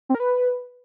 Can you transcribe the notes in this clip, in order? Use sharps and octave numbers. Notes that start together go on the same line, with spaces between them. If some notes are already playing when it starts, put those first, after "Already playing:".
C4
A#4
B4